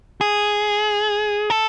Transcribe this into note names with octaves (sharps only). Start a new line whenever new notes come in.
G#4
A4